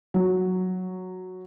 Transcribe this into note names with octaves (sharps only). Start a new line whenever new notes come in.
F#3